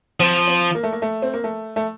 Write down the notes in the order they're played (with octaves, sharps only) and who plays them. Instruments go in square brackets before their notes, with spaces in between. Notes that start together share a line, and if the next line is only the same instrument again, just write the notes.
[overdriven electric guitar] F3 [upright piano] C4
[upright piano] C4
A#3
A3
A#3
A3
C4
A#3
A3
A3